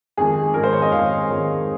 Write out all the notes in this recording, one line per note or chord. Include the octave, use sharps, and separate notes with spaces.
F2 D#3 G#3 G#4
F2 D#3 G#3 A#4
C5
C#5
D#5
F2 D#3 G#3 F5
F2 D#3 G#3